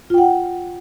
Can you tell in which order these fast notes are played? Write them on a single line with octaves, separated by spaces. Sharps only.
F4 G5 F#5